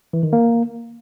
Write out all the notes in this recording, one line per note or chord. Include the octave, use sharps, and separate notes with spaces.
E3
D#3
A#3